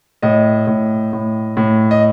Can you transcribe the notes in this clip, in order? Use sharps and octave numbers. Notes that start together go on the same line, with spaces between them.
A2 D#5
A2
A2
A2
D#5